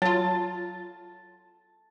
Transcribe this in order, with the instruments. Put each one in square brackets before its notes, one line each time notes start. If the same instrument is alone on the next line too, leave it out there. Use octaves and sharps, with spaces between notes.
[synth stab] F#3 F4 [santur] A5